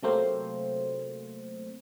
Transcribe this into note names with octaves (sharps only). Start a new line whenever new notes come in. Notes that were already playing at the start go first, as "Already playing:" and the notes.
C3 F#3 A3 A#3 C4 C5